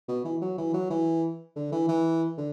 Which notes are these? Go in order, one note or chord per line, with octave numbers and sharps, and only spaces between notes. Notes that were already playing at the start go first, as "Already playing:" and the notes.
B2
E3
F#3
E3
F#3
E3
D3
E3
E3
D3